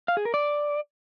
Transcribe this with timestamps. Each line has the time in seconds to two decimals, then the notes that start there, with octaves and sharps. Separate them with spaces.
0.08 F5
0.17 G#4
0.25 A#4
0.34 D5